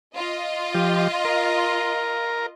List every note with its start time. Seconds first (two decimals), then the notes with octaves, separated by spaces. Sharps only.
0.16 F4 D#5
0.75 F3 G4
1.25 A#4